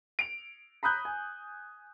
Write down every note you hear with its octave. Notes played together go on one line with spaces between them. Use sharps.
D7 F7
A#5 B5 D#6 F#6 G6
G#5